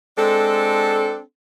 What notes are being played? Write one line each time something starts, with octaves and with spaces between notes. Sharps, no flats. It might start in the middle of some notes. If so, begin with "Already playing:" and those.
G#3 C4 D4 A4